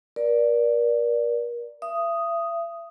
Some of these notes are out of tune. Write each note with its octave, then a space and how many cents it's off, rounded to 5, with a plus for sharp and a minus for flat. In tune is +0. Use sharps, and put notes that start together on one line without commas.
A#4 +35 D5 +0
E5 +35 D#6 +0